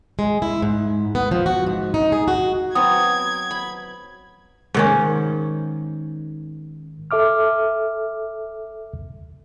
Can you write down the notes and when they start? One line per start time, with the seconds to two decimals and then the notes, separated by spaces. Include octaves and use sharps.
0.19 G#3
0.42 E4
0.62 G#2
1.15 B3
1.31 F3
1.46 F#4
1.66 G#2
1.94 D#4
2.12 G#4
2.28 F#4
2.75 F#3 B3 C4 D#6 G#6
3.51 B5
4.74 G#2 D#3 C#4
7.11 A4 E5 D6 F6